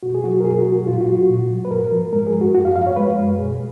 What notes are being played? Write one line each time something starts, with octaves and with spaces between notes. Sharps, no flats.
B2 F#4
G#4
F#3 F#4
A#4
B2 G#4
F#4
F#3
F#4
A#2 F4
F#4
F#3
F#4
A#2
F#3
B4
G#2 A#4
F3
G#3 A#4
G#4
G#2
F#4
F#2 F#4
F5
F3 F5
C#5
G#3 B4
F#2
B2 G#4